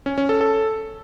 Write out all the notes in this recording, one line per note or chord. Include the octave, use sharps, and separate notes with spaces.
C#4
C#4
A4
A4